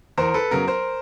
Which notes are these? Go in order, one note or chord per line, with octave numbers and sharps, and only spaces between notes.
E2 A#4 C5
A4 B4
C#3 F#3 B3 A#4
A#4 C5